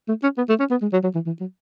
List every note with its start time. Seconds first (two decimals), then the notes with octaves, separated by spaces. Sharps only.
0.08 A3
0.23 C#4
0.37 B3
0.49 A3
0.59 C#4
0.71 B3
0.82 G#3
0.93 F#3
1.03 F#3
1.15 E3
1.26 E3
1.40 F#3